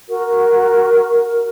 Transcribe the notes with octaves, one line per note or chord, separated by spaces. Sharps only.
F#4 A#4